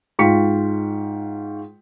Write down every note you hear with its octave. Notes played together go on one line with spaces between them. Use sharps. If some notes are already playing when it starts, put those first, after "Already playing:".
G#2 F4 G5 C#6 B6 C#7